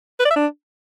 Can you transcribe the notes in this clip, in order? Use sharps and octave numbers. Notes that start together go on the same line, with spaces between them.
B4
D5
E5
D4